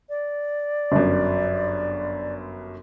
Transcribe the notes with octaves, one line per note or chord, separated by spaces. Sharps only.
D5
G1 F#2